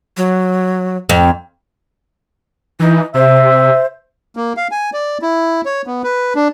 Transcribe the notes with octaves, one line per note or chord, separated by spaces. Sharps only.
F#3
F2
E3 D#4
C3 C5 E5
A#3
F5
G#5
D5
E4
C#5
B3
B4
D4